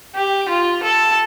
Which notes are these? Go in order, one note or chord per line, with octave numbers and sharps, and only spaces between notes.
G4
F4
A4